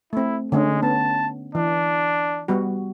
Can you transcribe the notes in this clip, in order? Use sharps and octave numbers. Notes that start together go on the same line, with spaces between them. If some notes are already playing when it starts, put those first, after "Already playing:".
A3 C4 E4
D3 G#3 A3 C#4
B3 C#4 A5
E3 D4
G3 B3 F#4